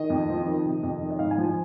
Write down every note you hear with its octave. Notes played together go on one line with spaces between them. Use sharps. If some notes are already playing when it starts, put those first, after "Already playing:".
Already playing: D#3 D#5
F2
F3
D#3
C3
F2
D#3
D#5
G#2 F5
G#5
F3
G#5